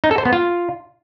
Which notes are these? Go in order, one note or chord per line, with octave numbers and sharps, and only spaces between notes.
D#4
A4
C5
B3
F4